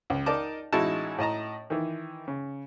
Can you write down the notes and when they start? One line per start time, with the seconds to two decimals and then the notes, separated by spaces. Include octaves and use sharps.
0.10 C#2
0.26 D#4 A#4 D5 D#5 A5 D6
0.73 A1 G#3 D#4 E4 F#4 A5
1.18 A2 D#5 A5 A#5
1.70 D#3 E3
2.28 C#3